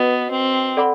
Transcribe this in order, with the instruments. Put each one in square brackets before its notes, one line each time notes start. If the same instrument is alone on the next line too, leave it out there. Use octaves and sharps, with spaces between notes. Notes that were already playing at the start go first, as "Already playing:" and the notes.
Already playing: [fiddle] B3 [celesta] F#4 B4 D#5
[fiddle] C4
[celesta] A4 D5 F#5 B5 D6